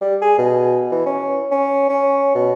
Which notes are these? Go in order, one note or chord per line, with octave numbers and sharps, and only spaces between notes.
G3
G#4
B2
E3
C#4
C#4
C#4
B2